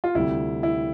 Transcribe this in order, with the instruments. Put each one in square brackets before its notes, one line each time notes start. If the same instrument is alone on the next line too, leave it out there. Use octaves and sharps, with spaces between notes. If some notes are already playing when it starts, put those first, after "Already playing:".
[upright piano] F4
[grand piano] D2 C3 G3 C4 G4 [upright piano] E4
[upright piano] E4